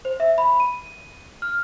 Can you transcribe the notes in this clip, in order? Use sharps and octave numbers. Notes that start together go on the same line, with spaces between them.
C5
E5
B5
D#7
F6